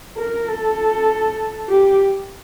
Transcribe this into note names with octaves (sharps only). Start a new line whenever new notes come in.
A#4
A4
G4